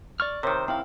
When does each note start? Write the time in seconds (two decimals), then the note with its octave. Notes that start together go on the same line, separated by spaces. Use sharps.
0.20 D5 C#6 F6
0.43 C3 D#3 A#4 C5 C#5
0.68 C4 E4 F5 G5